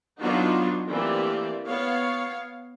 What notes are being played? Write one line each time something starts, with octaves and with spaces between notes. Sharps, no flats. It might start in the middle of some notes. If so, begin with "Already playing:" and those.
F#3 B3 D4 D#4 F4 F#4
E3 A3 A#3 C4 G4 D5
B3 C#5 F5